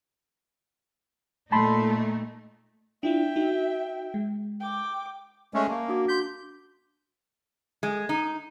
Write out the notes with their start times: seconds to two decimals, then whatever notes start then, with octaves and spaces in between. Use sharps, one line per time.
1.52 A#2 A3 D#4 A5 B5 C6
3.03 D4 E4 F4 E5 G5
3.36 D#4 F#4
4.14 G#3
4.60 G5 D6
5.54 G#3 A3 C#4
5.69 A#3 A5
5.88 D4 F#4 D6
6.08 C6 G6 B6
7.83 G#3
8.09 D#4